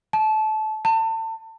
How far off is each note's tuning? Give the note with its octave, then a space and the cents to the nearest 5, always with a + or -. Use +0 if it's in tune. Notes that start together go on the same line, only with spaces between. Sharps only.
A5 -25
A5 +30